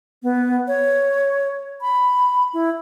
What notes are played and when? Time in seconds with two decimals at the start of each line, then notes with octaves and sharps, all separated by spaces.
0.23 B3
0.68 C#5
1.81 B5
2.54 E4